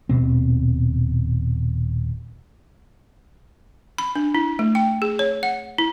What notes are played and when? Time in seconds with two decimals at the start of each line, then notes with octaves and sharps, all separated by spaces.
0.09 D#1 B2 C4
3.98 B5
4.16 D4
4.35 E4
4.59 A3
4.75 G5
5.02 G#4
5.19 C#5
5.43 F#5
5.78 E4